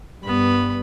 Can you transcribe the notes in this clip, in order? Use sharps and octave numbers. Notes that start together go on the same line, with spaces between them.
G2 B3 B5